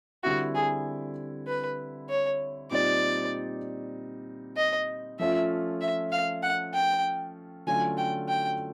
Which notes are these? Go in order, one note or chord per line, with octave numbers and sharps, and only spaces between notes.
D3 G3 C4 E4 F#4
G#4
B4
C#5
A#2 G3 C4 D#4 D5
D#5
F3 A3 C#4 F4 E5
E5
F5
F#5
G5
D3 F#3 A3 C#4 F4 G#5
G5
G5